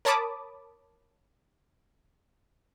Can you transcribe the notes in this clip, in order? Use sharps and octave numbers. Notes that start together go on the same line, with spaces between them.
A#4 C#5 A5 B5 D6 D#6